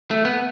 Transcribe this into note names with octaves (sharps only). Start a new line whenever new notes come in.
A3
B3